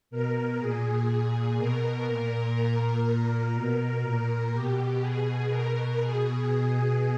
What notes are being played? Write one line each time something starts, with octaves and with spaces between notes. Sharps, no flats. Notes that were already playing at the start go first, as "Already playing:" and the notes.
B2 A#4
A#2 G#4
A#2
B2 A#4
A#2
A#2 A#4
A#2
B2 A#4
A#2
B2 G4
B2 G#4
B2 A#4
B2 G#4
B2